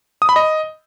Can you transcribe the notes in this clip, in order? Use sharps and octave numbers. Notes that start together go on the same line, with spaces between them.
D#6
B5
D#5